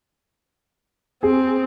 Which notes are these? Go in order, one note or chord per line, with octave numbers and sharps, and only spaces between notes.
C4 G#4